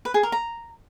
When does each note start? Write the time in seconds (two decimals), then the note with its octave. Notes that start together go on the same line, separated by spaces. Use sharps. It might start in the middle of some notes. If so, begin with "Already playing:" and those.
0.05 B4
0.14 G#4
0.23 A#4
0.32 A#5